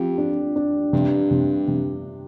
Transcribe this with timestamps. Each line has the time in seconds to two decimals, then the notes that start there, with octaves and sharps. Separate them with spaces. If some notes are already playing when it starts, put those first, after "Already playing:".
Already playing: F2 F3 G4
0.18 D4
0.56 D4
0.93 G2 C3
1.31 C3
1.68 C3